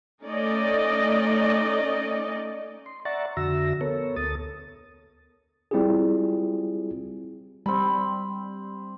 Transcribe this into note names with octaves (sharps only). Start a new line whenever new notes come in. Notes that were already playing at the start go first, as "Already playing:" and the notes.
A3 C#4 D#4 D5 D#5
C6
D5 E5 F#5 A#5 C#6 A6
F2 D3 F#4 E5 E6 A#6
B3 A4 A#4 C#5
D2 A4 D#6 A6
G3 C4 E4 F4 G4 G#4
G3 C4 B5